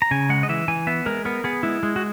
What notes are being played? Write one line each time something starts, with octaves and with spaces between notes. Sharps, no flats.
A#5
C#3 G#5
G#3 F#5
D#5
E3 E5
E3 G#5
B3 E5
G#3 A#4
B3 A#4
B3 G#4
G#3 E4
G#3
F#4